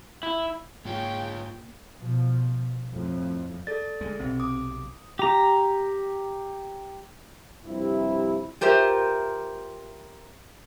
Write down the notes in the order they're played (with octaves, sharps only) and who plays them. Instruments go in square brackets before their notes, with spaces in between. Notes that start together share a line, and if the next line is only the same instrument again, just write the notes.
[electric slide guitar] E4
[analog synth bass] G#2 [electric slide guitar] G#3 F4 C#5 [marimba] A#3 [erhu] G5
[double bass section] B2 F3
F2 A2 F3
[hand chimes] A4 D5 [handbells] A6
[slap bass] D2 G#3
[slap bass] B1 C3 [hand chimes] C4
[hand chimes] D6 [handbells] D#6
[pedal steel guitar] G4 A#5
[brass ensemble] G2 C3 F3 E4
[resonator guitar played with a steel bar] F4 G4 A#4 C5 E5